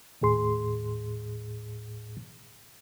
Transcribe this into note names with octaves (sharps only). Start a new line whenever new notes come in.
D#2 A2 G#4 C6